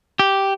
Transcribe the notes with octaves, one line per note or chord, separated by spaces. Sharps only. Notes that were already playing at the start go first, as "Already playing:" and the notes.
G4